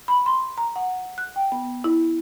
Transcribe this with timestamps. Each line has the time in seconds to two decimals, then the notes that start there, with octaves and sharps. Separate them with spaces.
0.08 B5
0.26 C6
0.58 A#5
0.76 F#5
1.18 F#6
1.36 G5
1.52 B3
1.84 E4